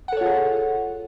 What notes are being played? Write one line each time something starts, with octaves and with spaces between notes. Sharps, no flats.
F4 G#4 A4 C#5 F#5